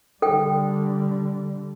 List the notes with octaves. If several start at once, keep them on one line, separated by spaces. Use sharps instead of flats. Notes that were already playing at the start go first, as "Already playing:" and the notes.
D3 G3 A4 G5